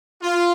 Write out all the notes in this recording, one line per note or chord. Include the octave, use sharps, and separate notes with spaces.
F4